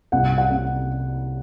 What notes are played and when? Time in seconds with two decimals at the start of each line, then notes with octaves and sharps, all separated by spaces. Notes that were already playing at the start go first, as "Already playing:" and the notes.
0.12 C2 F#5
0.38 F#5
0.51 C3